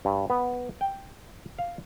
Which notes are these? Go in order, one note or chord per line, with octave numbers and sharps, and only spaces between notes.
G2
B3
G5
F5